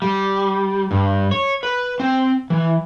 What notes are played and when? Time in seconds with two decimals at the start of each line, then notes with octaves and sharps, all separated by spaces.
0.02 G3
0.91 G2
1.31 C#5
1.63 B4
2.00 C4
2.50 E3